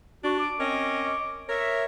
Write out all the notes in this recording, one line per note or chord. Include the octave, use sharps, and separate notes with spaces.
D4 F#4
D6
C4 C#4 A#4 D#5
A#4 C#5 E5